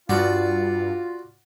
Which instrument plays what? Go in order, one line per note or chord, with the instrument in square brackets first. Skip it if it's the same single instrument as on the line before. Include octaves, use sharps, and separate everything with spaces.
[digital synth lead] G2 [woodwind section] F4 [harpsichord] F#4 D5 F#5